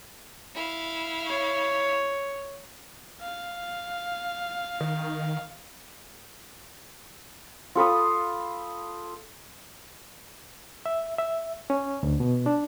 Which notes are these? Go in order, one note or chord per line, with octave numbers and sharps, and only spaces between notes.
E4 F5
C#5
F5
D#3
F4 A4 B5 D#6
E5
E5
C#4
D2
B2
D4